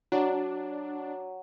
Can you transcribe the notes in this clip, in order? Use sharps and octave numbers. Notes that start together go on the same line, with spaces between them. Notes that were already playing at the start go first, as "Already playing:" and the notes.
F#3 D4